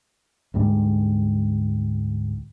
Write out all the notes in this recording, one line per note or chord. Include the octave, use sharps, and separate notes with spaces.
D2 G#2 G3 G#3